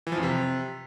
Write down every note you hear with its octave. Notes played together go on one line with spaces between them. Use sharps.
E3
F3
F2
C3